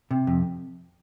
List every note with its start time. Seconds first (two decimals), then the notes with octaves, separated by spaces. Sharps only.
0.11 C3
0.27 F2